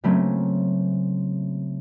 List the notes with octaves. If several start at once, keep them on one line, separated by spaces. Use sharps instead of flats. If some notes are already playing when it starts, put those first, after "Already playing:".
C#3 F#3 A3 A#3 C4 C#4